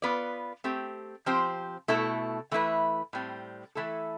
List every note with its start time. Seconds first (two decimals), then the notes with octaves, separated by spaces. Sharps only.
0.02 B3 F4 B4 D5
0.64 A3 C4 G4
1.26 F3 C4 G4 C5
1.88 B2 A3 E4 A4
2.51 E3 A3 E4 B4
3.13 A2 G3 C4
3.75 E3 A3 E4 A4